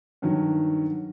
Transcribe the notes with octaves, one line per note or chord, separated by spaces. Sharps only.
G2 D#3 F#3